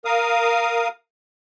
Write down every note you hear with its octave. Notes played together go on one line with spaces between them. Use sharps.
A#4 F5 D#6